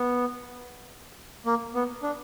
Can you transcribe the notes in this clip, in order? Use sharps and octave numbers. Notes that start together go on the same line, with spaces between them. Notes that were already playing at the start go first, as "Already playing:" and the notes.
Already playing: B3
A#3
B3
D4